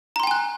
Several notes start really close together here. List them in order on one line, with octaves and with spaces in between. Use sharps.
A#5 C6 G5 G#5 F#6